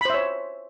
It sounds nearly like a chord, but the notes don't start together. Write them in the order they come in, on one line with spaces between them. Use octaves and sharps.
B5 C5 E5 C#5